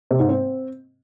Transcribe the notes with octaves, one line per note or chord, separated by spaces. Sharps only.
C3
G#2
C4